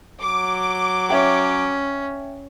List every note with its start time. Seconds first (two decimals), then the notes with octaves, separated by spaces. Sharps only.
0.21 F#3 D6
1.09 C#4 C#5 E5 G5